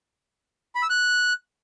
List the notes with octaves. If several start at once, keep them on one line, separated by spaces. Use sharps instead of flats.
B5
E6
F#6